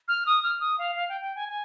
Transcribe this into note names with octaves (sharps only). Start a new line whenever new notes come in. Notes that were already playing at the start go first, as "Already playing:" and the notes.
F6
D#6
F6
D#6
F5
F5
G5
G5
G#5
G#5